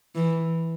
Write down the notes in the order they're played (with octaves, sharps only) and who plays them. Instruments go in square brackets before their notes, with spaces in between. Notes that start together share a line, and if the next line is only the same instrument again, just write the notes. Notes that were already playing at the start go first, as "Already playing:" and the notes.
[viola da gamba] E3